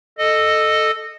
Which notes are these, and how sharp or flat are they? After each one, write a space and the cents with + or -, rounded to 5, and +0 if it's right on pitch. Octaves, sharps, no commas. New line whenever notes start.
A4 +0 D#5 -15